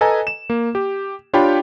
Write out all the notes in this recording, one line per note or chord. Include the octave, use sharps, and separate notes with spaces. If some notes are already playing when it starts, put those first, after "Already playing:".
A4 B4 D#5 G#5 A#5
E7
A#3
G4
D4 F4 G4 C#5 G5 B5